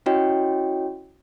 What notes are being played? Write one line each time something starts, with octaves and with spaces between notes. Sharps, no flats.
C#4 E4 F#4 C#5 D#5 G5